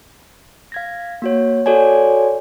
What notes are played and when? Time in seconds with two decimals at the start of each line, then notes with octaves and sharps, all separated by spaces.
0.72 F5 G#6 A#6
1.22 A#3 F#4 C#5
1.66 F#4 A4 C#5 D5 G#5